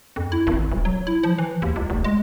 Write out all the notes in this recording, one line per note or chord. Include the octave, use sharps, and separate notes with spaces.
F2
E4
G#1
D#1
F#3
E4
F3
E3
D#2
C#2
F1
G#3